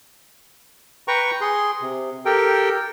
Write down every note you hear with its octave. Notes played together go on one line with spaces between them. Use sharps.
B4 G5 A#5 C#6
G#4 C6
C3
G4 A4 A#4 G5